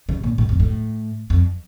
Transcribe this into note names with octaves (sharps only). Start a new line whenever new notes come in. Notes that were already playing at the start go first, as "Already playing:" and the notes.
C#3
A#2
A2
F2
A2
F2